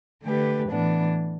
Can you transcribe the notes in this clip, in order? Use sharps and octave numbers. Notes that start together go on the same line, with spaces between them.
D3 A3 G4 B4
A2 E3 B3 D4